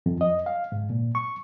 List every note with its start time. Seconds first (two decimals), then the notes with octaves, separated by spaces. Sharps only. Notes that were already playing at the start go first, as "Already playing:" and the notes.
0.06 F2
0.21 D#5
0.46 F5
0.72 G#2
0.90 A#2
1.15 C#6